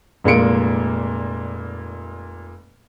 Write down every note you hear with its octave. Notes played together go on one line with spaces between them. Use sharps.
F1 A#2 G#3 A#3 C#7 D7